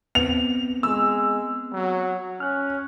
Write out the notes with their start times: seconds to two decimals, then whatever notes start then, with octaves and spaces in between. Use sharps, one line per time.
0.15 B3 C4 F7
0.83 G#3 E6
1.73 F#3
2.40 C#4 F6 F#6